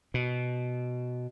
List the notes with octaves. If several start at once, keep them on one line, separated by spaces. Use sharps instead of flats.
B2